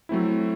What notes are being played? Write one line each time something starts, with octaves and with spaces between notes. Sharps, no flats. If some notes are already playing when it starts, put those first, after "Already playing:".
F#3 A3 C4 E4